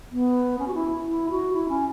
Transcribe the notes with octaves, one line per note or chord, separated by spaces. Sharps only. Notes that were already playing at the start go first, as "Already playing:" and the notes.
B3
C#4
F#4
E4
E4
F#4
E4
C#4